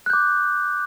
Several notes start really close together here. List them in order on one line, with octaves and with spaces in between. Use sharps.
F#6 G6 D6